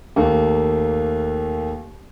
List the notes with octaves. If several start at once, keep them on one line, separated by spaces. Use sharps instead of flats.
D#2 A3 A#3